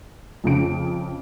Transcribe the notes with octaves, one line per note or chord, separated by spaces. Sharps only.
F2 C#3 D7